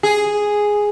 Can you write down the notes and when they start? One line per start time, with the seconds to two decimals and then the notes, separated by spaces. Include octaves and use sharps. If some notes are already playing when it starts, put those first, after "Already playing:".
0.03 G#4